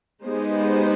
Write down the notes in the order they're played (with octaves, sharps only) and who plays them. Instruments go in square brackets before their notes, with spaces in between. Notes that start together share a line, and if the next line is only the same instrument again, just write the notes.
[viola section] G#3 B3 D#4 G4 C5